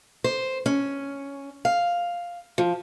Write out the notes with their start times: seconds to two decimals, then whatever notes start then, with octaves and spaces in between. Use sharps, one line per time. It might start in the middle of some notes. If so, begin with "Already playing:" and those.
0.24 C5
0.66 C#4
1.65 F5
2.58 F3